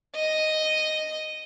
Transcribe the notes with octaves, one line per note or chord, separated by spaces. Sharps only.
D#5